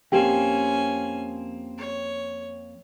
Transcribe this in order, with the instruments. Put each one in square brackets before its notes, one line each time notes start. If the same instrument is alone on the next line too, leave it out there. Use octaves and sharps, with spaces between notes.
[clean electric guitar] F2 A#3 C4 [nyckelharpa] C#4 G#5 [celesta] G4 G5
[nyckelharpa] C#5